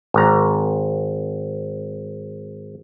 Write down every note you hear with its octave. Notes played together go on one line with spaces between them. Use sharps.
G#1 A#5